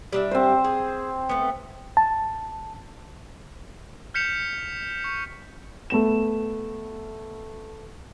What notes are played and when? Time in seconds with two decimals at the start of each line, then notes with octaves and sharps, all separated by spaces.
0.13 G3 D4 E5
0.31 C4 C5
0.64 G#4
1.29 A3 B3
1.97 A5
4.14 F6 G6 B6 C#7 E7 F7
5.04 C#6
5.90 A3 B3 E7